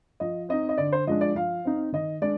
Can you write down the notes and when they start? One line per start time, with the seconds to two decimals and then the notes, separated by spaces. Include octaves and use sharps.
0.20 F3 D#5
0.49 C4 D#4 D#5
0.69 D#5
0.78 D3 D5
0.92 C5
1.07 F3 G#3 D4 D#5
1.21 D5
1.35 F3 F5
1.65 C4 D#4
1.93 D#3 D#5
2.22 G#3 D4 D5